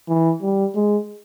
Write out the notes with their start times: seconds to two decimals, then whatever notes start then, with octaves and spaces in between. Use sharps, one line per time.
0.09 E3
0.42 G3
0.75 G#3